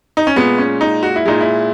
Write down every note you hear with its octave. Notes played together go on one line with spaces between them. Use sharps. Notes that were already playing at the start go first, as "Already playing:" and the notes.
D#4
C#4
A#2 G#3 B3
C#4
D#4
F#4
E4
A#2 G#3 D#4
E4